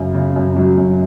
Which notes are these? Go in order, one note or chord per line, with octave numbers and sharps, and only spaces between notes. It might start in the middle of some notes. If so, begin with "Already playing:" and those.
Already playing: F#2 C#3
C#3
F#2
F#3
F#2